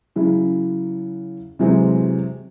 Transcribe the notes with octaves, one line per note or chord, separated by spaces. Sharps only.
C#3 F#3 E4
C3 E3 F#3 G#3 C4